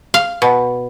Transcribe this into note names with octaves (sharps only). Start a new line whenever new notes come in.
F5
B2